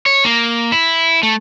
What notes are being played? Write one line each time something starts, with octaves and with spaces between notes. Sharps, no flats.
C#5
A#3
E4
A3